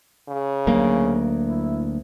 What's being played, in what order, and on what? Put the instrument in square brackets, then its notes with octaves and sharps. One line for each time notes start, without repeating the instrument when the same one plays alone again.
[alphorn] C#3
[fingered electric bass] D2 F#3 A#3
[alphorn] E4